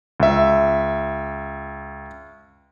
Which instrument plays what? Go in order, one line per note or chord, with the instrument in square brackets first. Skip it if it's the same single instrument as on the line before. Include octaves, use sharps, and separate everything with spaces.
[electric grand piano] C#2 E5